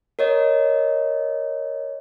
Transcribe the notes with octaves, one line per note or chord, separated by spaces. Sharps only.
A#4 C#5 D#5